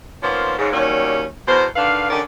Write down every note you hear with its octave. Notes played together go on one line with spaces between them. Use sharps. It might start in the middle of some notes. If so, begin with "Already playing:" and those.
D#3 F3 A#3 B3 C#4 C5
G#2 C#3
D#2 D#3 F#3 G3 A#3 C#4
E2 B2 A#4 C5
D3 D#3 D4 B4 F5
D3 C#4 D#4 G4 A#4 D5